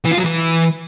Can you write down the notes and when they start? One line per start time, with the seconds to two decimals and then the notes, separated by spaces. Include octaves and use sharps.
0.05 E3
0.12 F4
0.18 F#3
0.25 E3